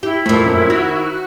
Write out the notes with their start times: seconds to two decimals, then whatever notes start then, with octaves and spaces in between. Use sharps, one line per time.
0.03 E4 G4
0.26 F2 A#2 A3
0.46 F#2
0.70 D#3 F#4